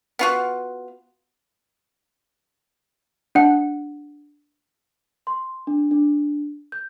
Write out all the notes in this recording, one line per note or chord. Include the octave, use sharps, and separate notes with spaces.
B3 F4 F#4
D4 F#5
C6
D4
D4
G6